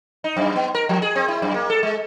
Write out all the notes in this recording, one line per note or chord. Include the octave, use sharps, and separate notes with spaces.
D#4
F#2
B3
A#4
F3
G#4
C4
E4
F#2
A#3
A4
G#3